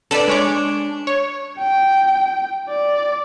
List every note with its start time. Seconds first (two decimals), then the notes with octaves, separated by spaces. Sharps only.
0.11 D4 A4 B4 D5 A5
0.28 G#3 C#5 D6
1.07 C#5
1.58 G5
2.68 D5